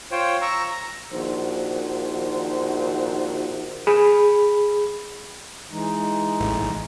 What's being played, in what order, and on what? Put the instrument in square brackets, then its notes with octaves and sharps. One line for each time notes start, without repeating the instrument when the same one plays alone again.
[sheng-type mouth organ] F4 C5 C#5 G5
A#5 C#6 E6
A#5
[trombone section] A#1 D#3 F#4 C5
[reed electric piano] G#4 B5
[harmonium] E3 G#3 D#4
[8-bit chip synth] A1